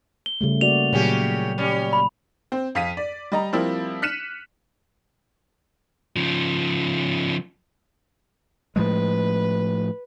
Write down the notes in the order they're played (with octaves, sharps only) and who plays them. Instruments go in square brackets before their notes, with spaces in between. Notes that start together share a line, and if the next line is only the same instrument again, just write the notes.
[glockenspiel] G7
[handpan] C#3 G3 A3
[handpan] A#3 F#4 D5 [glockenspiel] F7
[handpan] A#2 F#3 [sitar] C#3 C#4 G4
[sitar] G3 C#4
[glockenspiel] B5
[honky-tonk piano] C4 C5
F2 F5 B6 D#7
D5
G3 D#5 A#5
F3 G3 A#3 C4 E4
F6 F#6 B6 C#7 D#7 E7
[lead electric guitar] C#3 F3
[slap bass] A2 F3 G#3 [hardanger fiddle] B4